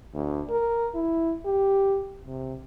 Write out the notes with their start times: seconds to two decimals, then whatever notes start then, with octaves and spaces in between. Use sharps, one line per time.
0.14 D2
0.50 A#4
0.95 E4
1.45 G4
2.25 C3